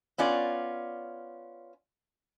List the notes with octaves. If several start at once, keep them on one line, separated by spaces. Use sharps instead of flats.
B3 C#4 F4 D5